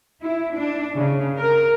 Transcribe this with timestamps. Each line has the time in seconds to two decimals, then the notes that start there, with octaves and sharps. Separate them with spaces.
0.21 E4
0.55 D4
0.94 C#3
1.37 A#4